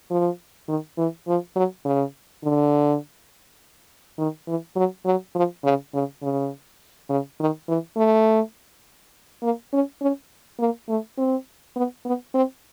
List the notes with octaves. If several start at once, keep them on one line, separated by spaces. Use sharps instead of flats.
F3
D#3
E3
F3
F#3
C#3
D3
D#3
E3
F#3
F#3
F3
C#3
C#3
C#3
C#3
D#3
E3
A3
A#3
C#4
C#4
A#3
A3
C4
B3
B3
C4